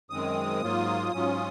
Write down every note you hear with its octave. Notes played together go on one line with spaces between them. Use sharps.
F#2 D#3 G#3 C4 D#6
G#2 F#3 A#3 F4
G#2 F#3 C#4 F4